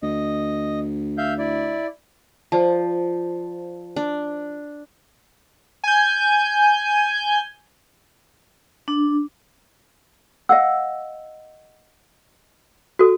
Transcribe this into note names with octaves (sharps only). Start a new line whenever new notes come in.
D2 D#5
E5 F5 G6
E4 D5
F3 C5 D5 A5
D4
G#5 G6
D4
D#5 F5 F#5 E6
F#4 A4